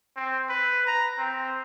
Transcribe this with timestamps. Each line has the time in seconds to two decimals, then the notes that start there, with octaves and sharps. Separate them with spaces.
0.16 C4
0.49 B4
0.87 A#5
1.18 C4